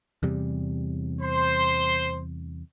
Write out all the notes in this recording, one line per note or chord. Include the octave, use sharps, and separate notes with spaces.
E2 C3 G3
C5 C6